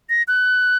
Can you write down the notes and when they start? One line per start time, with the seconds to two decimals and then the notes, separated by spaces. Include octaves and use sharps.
0.09 A#6
0.28 F#6